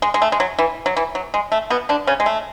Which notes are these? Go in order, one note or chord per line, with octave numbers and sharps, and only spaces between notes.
G#3
G#3
A3
G#3
F#3
E3
F#3
E3
F#3
G#3
A3
B2 B3
D3 D4
C#3 C#4
G#3
A3